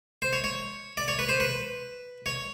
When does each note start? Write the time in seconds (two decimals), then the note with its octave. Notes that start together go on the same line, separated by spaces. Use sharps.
0.22 C5
0.33 C#5
0.44 C#5
0.97 D5
1.08 C#5
1.19 B4
1.29 C5
1.40 B4
2.26 C#5